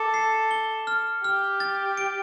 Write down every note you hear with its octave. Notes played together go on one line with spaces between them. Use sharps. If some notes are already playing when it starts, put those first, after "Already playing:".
Already playing: A4 D6
C7
G7
F6
G4 F6
A6
D7